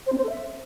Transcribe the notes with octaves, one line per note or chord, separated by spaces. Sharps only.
C5
C4
C5
A4
E5